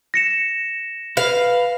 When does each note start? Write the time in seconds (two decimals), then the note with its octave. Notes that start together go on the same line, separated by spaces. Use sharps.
0.14 A#6 C#7 E7
1.17 B4 F5